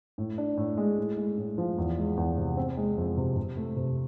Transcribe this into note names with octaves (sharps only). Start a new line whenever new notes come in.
A2
D4
A2
G#3
A2
G#3
A2
F3
E2
G#3
E2
C3
C4
G#3
F2
C3
C3
A3
C3